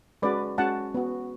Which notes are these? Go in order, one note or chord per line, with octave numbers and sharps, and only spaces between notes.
G#3 C#4 F#4 B4 D5
G#3 C#4 F#4 F#5 A5
B3 F#4